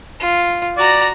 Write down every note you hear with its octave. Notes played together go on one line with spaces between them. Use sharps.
F4
F#4 D5 A#5